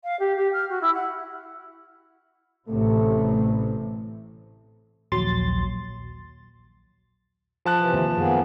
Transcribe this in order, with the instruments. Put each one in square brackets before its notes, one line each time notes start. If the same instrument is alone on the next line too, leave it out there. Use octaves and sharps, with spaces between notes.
[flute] F5
G4
G4
F6
F#4
E4
F#5
[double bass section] A1 A2 C3 [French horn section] A3
[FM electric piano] A#1 D#2 F#3 C6 A6
[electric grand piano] F3 A5 F#6
[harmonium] C3 E3
[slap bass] D#3 A#3 C4
[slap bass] F#2 D#3 [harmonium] A#3 B3 G#4